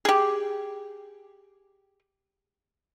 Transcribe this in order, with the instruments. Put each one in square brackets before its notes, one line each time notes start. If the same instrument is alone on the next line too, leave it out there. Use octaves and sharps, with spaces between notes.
[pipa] G4 G#4